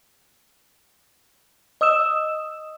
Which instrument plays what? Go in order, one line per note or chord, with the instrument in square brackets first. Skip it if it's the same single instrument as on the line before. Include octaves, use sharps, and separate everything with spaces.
[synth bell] D#5 D#6 E6 E7